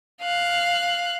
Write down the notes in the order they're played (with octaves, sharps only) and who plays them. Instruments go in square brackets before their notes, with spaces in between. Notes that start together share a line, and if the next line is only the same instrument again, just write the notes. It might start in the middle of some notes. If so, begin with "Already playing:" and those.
[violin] F5 F#6